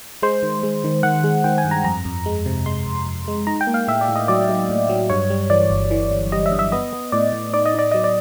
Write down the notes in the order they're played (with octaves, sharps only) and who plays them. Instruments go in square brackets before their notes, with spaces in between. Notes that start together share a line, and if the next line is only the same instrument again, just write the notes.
[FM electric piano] G#3 C5
D#3
G#3
D#3
D#3 F#5
G#3
D#3 G5
G#5
G2
A#5
F2 A#5
F2
G#3
C3
G#3 C6
F2
F2
G#3
D#4 A#5
G5
A#3
F5
A2 E5
D5
A2
D#5
F#3 D5
F#3
A2
F#3
G2 C#5
G3
E3 D5
G1
E3
G1
G3 D#5
E5
G2
E5
B3 D#5
B3
A2 D5
A2
D#4 D5
D#5
D#4 D5
F#3 D#5
D5